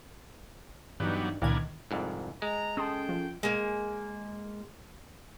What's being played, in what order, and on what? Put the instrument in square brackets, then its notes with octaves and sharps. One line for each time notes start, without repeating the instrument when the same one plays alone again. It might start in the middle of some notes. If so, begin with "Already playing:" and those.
[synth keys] G2 E3 D#4 [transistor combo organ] F#3 G3 B3 [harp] D5
[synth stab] C#2 A#2 G#6 [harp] D#3 [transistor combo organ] B3 D4 A#4 [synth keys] E4
[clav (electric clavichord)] C2 F2 G#2
[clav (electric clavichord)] G#3 [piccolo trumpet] A#5
[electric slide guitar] C#4 G#4 A4 [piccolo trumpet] G5 [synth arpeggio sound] A5 C6 D#6
[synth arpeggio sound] F3 F4
[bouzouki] G#3 A#3